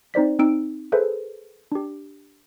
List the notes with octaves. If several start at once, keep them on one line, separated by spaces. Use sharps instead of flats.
C4 D#4 C5 D5 B6
C4 D#4 E6 D7
G#4 A4 B4 C5 E5
D4 G4